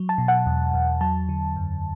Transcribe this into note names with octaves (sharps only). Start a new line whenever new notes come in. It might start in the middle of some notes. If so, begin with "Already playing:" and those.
Already playing: F#3
A5
B2
F#5
E2
E2
F#3 A5
D3
F#2